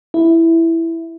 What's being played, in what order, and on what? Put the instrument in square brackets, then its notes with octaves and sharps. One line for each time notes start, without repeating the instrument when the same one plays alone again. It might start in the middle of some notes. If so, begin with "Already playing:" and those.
[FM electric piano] E4